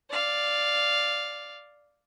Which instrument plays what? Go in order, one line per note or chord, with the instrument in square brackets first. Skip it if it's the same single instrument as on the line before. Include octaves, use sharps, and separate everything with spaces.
[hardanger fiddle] D5 F5